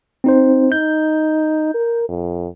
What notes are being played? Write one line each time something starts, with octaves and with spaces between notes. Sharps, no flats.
C4 D#4 C5
D#4 G6
A#4
F2